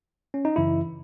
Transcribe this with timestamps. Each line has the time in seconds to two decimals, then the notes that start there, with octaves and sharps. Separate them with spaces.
0.34 C#4
0.45 D#4
0.56 F#2 C#3 E3 E4